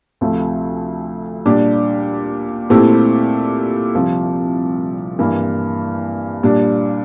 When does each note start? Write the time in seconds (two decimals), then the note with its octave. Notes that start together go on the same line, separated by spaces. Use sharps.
0.21 D2 C3 F3 A3
1.46 A#2 G3 D4 G4
2.70 A#2 A3 C4 E4 G4
3.95 C2 C3 F3
5.19 G2 E3 A#3
6.43 A#2 G3 D4